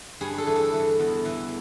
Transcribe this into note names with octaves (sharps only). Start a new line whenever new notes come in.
G2 G#4
A4
E3
A4
E3
E2
E3